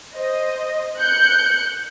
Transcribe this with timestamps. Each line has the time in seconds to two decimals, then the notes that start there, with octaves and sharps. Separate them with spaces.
0.16 C5 D#5
0.98 F#6 G6 C#7